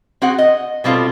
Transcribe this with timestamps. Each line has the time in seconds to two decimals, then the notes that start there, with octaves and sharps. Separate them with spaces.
0.22 C4 F#4 G#4 F#5
0.38 D#5
0.84 B2 G3 C4 F4 A4